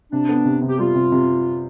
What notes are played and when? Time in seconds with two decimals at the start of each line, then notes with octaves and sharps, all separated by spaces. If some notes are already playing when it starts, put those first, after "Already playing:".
0.12 C3 D4
0.29 B3
0.45 C3
0.62 C3
0.68 G4
0.78 G3 F4
0.95 C3
1.12 C3